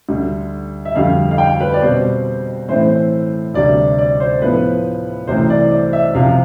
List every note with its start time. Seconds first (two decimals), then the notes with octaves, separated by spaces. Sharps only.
0.08 D2 D3 G3
0.85 E5
0.95 F2 D3 G3 F5
1.31 F5
1.38 G5
1.61 B4
1.74 D5
1.82 B2 G3 C4 C5
2.68 A2 E3 A3 C4 C5
3.54 D2 C3 G3 D5
3.99 D5
4.20 C5
4.42 A2 F3 B3 B4
5.27 C2 C3 E3 A3 C4 C5
5.50 D5
5.71 D5
5.93 E5
6.15 C2 C3 F3 F5